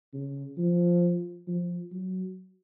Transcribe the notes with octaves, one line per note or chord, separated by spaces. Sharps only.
C#3
F3
F3
F#3